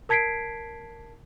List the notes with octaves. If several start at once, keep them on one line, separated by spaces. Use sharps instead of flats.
A#4 A5 G#6 B6 C7 D7